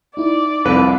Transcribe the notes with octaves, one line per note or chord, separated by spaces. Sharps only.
D#4 E4 D5
C2 F2 B4